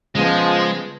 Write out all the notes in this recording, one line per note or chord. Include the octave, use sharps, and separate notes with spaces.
C#3 F3 G#3 B3